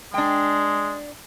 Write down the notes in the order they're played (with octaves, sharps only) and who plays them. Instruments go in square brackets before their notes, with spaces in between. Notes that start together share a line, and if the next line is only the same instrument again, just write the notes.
[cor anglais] G#3 [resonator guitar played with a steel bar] D4 G5